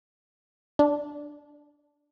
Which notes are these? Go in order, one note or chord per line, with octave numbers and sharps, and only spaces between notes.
D4